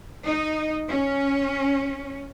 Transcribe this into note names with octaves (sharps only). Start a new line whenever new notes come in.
D#4
C#4